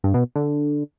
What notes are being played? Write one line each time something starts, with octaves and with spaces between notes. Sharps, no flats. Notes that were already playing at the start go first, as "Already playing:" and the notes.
G2
B2
D3